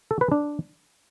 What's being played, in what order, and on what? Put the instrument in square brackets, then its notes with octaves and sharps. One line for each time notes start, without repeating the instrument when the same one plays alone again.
[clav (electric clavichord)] A4
B4
D4